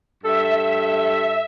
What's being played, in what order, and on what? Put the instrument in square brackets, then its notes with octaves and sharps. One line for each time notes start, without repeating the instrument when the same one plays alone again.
[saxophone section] G2 A4 [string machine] E5